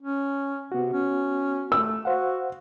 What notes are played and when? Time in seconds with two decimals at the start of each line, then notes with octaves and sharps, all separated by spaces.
0.02 C#4
0.72 C3 B3 F#4
0.93 C#4
1.72 A3 E6
2.05 F#4 C5 F5 F#5